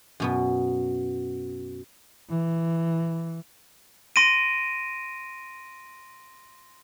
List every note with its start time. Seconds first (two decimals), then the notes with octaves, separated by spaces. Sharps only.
0.20 F#2 B2 B3
2.29 E3
4.16 C6 A#6 D7 D#7